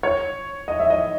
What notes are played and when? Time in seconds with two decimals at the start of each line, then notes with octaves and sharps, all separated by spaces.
0.03 C#5
0.68 D#5
0.79 E5
0.90 D#5